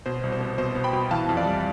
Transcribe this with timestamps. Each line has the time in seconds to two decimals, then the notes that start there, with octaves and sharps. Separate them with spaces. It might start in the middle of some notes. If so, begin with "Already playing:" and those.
0.06 B2 C5
0.23 C2
0.32 C5
0.41 B3
0.58 B2 C5
0.75 B3
0.84 G5 B5
0.93 B2
1.11 E3 F5 A5
1.29 F2
1.37 D5 F5
1.45 G3